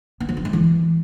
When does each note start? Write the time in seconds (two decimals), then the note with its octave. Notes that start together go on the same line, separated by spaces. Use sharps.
0.20 B3
0.29 F3
0.37 F4
0.45 G#3
0.53 E3